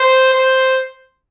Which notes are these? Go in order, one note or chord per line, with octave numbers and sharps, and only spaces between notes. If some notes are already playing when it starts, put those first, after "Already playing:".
Already playing: C5
C5